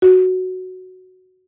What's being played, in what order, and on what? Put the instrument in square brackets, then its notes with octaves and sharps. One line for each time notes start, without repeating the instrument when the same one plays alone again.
[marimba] F#4